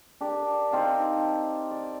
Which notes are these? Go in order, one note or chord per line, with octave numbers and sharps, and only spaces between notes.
D4 G4 A#4
C4 D#4 F5 A5
D5